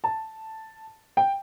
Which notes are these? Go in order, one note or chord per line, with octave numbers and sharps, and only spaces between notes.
A5
G5